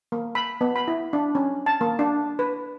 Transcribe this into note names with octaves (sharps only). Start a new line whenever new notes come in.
A#3
B5
B3
B5
E4
D4
C#4
A5
A#3
D4
B4